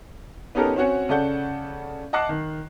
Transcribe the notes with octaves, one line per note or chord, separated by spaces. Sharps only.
B3 C#4 D#4 G4 A4 A#4
C4 C#4 F#4 C#5 F#5 G#5
C#3 C#4 A4 D5 F#5 G6
D#5 F#5 A5 D6 F#6 C7
D#3